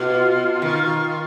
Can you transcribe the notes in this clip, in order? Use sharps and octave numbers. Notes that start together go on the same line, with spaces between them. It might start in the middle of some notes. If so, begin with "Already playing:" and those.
Already playing: B2 F4
D#3